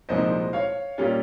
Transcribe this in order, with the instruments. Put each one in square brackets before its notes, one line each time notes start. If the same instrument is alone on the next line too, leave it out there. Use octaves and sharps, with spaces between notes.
[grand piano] C2 A#2 F3 G#3 D#4 C5 D#5
C#5 F5
A#2 G3 C#4 F4